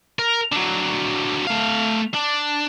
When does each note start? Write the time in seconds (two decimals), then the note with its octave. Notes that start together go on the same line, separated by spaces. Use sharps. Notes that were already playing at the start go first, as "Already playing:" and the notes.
0.19 A#4
0.52 D3 F#3
1.47 A3 F5
2.14 D4